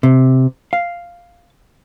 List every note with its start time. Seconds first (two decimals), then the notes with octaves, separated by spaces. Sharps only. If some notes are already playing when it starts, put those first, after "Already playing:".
0.03 C3
0.73 F5